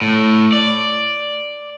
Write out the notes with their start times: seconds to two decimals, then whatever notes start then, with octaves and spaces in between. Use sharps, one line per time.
0.02 A2
0.53 D5